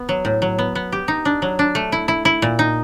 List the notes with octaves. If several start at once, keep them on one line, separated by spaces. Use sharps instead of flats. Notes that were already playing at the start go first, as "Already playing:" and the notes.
Already playing: B3
F#3
A2
F#3
B3
B3
G4
D#4
D4
F#3
D4
A3
E4
E4
E4
A#2
D#4